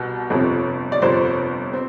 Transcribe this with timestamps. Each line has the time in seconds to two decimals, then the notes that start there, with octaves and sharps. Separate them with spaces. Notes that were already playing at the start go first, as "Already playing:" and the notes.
Already playing: C2 B2
0.30 G1 F2 C3
0.92 D5
1.02 G1 F2 C3 C5
1.73 C4